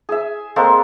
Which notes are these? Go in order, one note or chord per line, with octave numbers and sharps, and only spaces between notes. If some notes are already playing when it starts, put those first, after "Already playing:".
G#4 E5
G#3 A#3 C4 A4